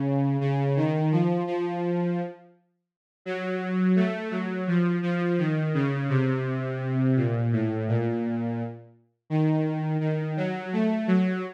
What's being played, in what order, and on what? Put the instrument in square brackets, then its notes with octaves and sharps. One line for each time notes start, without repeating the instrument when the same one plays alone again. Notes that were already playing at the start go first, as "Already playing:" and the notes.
Already playing: [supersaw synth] C#3
C#3
D#3
F3
F3
F#3
A3
F#3
F3
F3
D#3
C#3
C3
A#2
A2
A#2
D#3
D#3
F#3
A3
F#3